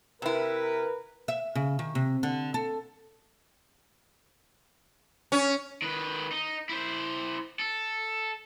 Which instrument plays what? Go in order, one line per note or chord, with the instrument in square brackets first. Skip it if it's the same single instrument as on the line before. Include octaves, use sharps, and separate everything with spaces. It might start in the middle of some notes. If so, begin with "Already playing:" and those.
[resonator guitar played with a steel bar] C3 E4 [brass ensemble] A#4 B4
[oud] E5
C#3
D#3
C3
D3
A4
[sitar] C#4
[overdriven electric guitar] D#3 B4
D#4
E4 C5
A4